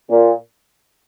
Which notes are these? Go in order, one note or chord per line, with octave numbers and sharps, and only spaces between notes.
A#2